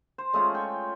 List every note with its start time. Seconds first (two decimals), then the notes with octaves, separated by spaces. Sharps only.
0.18 C5
0.33 G#3 A3 C#4 F4
0.55 G5 C#6